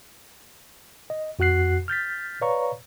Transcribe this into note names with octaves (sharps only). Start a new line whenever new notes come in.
D#5
F2 F#4 F#5 F#6 C7
F6 G6 A6 B6
B4 C#5 D5 F5 A#5 C#6